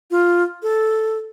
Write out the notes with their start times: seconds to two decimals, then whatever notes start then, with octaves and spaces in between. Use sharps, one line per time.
0.11 F4
0.63 A4